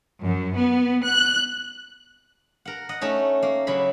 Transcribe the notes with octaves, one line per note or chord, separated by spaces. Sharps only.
F#2
B3
F#6
A#4 F#5
D#5 F#5
A3 C#4 D#4
A#3
C#3 F#3 E4 B5